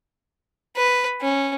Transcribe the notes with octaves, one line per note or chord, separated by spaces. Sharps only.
B4
C#4